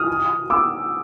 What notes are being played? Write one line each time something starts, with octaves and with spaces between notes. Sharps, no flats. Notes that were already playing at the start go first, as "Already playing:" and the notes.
Already playing: D#6 F6
D6 E6